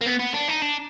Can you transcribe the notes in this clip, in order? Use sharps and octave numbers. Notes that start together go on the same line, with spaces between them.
A#3
B3
B3
D4
D#4
D4